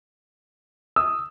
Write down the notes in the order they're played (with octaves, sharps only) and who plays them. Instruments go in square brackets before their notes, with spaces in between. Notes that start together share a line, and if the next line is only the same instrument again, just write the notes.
[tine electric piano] D#6 [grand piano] E6